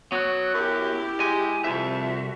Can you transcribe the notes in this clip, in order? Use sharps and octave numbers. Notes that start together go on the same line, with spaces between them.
F#3 B3 F#4
F#2 E4 G4
G#3 G#5
C2 F2 E5
F#4